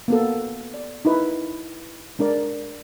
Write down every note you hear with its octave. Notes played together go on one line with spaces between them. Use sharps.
A#3 B3 A4
D5
D#4 E4 B4
G#3 D4 A#4 D5